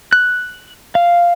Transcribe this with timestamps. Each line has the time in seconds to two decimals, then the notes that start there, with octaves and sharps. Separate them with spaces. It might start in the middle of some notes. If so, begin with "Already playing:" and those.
0.13 F#6
0.95 F5